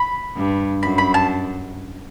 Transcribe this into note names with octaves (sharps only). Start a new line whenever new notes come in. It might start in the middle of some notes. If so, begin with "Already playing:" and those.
Already playing: B5
G2
F#2 B5
B5
A5